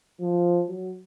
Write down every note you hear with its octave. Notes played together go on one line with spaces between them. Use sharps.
F3
F#3